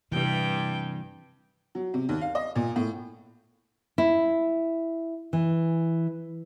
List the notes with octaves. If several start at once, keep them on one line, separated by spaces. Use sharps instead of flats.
G2 C3 E3 G5
F#3
C3
D#2
F5
D#5
A#2
A2
E4
E3